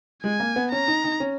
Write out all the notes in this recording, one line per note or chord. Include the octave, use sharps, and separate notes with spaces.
G#3 G#5
A#3
B3
C#4 A#5
D#4
D#4
C#4